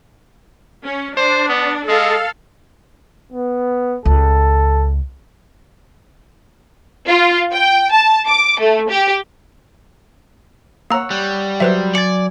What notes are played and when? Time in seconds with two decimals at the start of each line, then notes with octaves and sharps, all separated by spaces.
0.86 C#4
1.17 D4 C5
1.49 B3
1.88 G#3 A4 F5
3.32 B3
4.05 C#2 A4
7.07 F4
7.54 G5
7.92 A5
8.27 D6
8.60 A3
8.90 G4
10.90 A#3 C#5 F#5 A#5 E6
11.10 G3 F#6
11.60 F#3 B4 C5 E5 C6
11.95 D5 G#5 A6 C#7